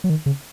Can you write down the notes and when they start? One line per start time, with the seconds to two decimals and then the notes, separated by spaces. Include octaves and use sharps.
0.04 F#3
0.10 D#3
0.26 C#3